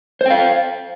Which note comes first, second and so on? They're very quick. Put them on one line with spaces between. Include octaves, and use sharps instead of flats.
C5 G5 F5